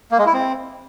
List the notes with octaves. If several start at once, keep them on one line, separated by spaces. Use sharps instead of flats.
A#3
G#3
E4
C4